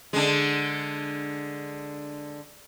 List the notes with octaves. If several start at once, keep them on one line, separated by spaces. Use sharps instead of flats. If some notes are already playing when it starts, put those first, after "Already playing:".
D3 G#3